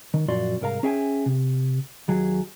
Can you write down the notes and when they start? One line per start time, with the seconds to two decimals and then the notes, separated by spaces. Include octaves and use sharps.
0.14 D#3
0.28 F#2 A#2 F3 F#4 D5 C6
0.61 C2 G#2 A#4 F5 A#5
0.83 C#4 G#4 E5 G5 G#5
1.26 C3
2.08 D#2 F#3 G#4